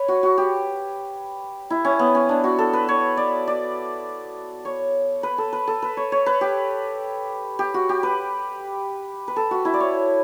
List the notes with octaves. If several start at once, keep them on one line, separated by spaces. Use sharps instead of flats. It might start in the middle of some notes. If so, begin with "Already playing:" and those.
Already playing: B4 C#5
F#4
F#4
G4
E4
C#4
B3
C#4
D4
F#4
A4
B4
C#5
D5
D5
C#5
B4
A4
B4
A4
B4
C#5
C#5
B4
G4
G4
F#4
G4
B4
B4
A4
F#4
E4
D5
C#5